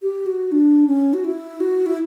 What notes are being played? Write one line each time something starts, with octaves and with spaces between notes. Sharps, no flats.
G4
F#4
D4
C#4
F#4
E4
F#4
E4